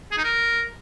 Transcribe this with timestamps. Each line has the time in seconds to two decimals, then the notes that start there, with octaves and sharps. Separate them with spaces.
0.12 G#4
0.18 D#4
0.24 A#4